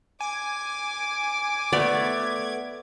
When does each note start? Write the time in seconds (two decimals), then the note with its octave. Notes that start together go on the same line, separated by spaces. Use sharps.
0.21 G#5 D6
1.73 A3 B3 D5 G#6